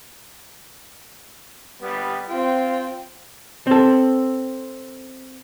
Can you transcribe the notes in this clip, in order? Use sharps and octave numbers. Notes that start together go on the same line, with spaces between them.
G3 B3
C4 F4 G5
C4 A4